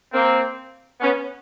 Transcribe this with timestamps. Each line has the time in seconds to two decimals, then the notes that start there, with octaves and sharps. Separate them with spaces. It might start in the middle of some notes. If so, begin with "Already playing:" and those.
0.13 A#3 C4
1.01 B3 C#4